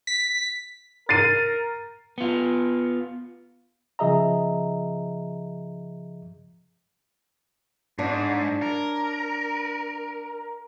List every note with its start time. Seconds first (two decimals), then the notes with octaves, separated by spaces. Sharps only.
0.07 B6
1.09 A#4 A6 C7 D#7
2.18 B3 F4
3.99 C#3 F3 G#4 D#5 E5 A#5
7.98 G#2 D4 C#5
8.62 A#4